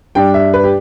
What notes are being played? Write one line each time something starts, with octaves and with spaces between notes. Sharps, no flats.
G2 G3 D4 G5
E5
B4
G4